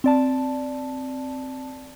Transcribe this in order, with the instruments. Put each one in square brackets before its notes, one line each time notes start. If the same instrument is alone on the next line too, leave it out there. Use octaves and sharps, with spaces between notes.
[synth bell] C4 D5 A5